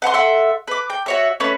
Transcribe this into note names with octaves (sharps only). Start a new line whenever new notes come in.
B4 F#5 A#5 C6
A4 E5 F#5 C6
B4 D6
G5
F#4 C#5 E5
A3 C#4 B4 C#5